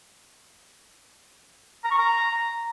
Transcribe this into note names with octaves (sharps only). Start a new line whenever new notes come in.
A#5
C#6
A#5